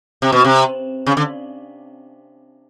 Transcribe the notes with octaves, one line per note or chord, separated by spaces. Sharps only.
C3
B2
C3
C#3
D3